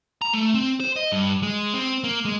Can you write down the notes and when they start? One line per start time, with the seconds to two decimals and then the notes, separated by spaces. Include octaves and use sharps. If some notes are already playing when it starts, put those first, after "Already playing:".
0.22 A#5
0.33 A3
0.54 C4
0.80 C5
0.96 D#5
1.12 G2
1.43 G#3
1.74 C4
2.04 A#3
2.25 G#3